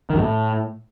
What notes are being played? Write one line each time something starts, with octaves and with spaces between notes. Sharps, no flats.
D#3
F#2
A2